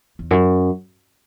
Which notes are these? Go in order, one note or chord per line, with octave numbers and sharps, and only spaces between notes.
E2
F#2